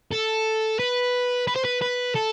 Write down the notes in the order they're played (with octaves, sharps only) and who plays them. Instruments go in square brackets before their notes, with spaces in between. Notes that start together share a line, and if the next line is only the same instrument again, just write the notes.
[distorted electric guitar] A4
B4
B4
C5
B4
B4
A4